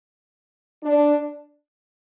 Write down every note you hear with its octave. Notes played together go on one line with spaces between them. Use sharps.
D4